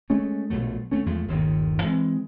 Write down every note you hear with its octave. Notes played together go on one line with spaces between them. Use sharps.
G#3 A3 C#4
A#1 B2 F#3 A3
D2 A3 C#4
E2 F3 G#3 A3
G1 D#2 A#2 D#3
E3 G#3 A3 C4